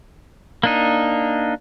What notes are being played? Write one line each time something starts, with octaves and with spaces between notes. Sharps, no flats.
A#3 D4 D#4